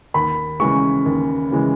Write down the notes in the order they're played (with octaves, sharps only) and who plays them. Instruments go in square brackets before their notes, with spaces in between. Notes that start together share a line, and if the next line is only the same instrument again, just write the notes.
[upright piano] D#2 [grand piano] B5
[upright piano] C#3 E3 G#3 [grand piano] C#6
[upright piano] D#2
C#3 E3 G#3